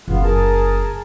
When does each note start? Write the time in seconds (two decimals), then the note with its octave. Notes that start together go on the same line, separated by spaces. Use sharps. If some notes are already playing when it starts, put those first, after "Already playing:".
0.08 F#1 B3 F4
0.23 G#4 A#4 A5